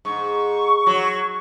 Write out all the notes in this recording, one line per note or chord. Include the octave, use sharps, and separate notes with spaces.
G#2 C#6
F#3